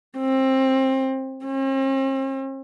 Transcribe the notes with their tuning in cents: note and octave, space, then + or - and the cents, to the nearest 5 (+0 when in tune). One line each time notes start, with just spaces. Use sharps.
C4 +20
C4 +45